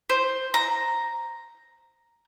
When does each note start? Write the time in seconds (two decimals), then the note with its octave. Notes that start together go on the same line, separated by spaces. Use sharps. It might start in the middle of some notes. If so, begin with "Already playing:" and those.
0.09 C5
0.54 A#5